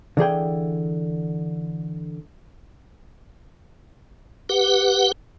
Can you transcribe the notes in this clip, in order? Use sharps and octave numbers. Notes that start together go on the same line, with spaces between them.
D3 E3 G#4 G5
G4 B4 F#5